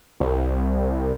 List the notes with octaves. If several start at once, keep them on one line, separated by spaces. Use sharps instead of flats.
C2